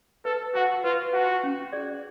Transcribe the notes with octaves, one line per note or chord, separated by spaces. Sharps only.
A4 B4
F#4 F#5 A5
F4 B4
F#4 F#5 A5
C#4
G#4 D5